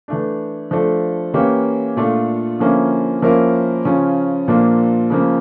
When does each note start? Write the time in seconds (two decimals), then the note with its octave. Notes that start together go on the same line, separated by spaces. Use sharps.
0.08 E3 A3 D4
0.71 F3 A3 D4 A4
1.34 E3 A#3 C#4 G4 C#5
1.96 A#2 A3 D4 F4 A4
2.59 D3 F3 A#3 C#4 E4
3.22 F3 A#3 C#4 E4 A#4
3.85 C#3 F3 C#4 F4
4.48 A#2 F3 A#3 D4
5.10 C#3 F3 A#3